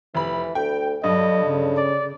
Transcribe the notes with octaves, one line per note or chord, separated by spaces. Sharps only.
F1 E3 B5
D2 G5
G2 D3 F#3 D#5
C#3
D5